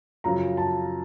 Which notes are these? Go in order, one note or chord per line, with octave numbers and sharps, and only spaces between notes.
F#2 C#3 F3 A#5
A5